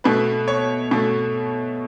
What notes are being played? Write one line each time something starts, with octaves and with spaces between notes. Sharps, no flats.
B2 A3 B4
C#5
B2 A3